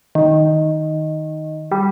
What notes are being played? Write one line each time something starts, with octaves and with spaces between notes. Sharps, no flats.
D#3
G3